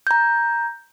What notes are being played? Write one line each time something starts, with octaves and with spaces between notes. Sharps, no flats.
A#5 G6